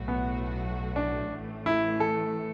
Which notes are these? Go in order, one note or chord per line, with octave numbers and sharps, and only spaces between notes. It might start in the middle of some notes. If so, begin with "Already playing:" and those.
Already playing: B1 A2 F#3 A3 F#4
B3
D4
A1 A2 E3 A3
E4
A4